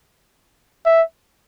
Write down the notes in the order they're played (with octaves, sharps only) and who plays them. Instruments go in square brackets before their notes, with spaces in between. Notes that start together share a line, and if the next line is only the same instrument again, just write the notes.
[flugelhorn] E5